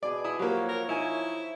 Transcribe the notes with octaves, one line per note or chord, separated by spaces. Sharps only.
B2 G#4 D5
E4 B5 D#6
F3 F#3 A#3 G4 C#5
A#4
D#4 E4 G#5